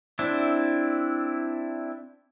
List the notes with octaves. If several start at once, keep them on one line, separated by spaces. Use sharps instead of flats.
C4 D4 E4